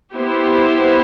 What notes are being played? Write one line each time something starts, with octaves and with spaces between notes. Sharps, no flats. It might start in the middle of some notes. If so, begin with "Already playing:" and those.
B3 E4 G4 C5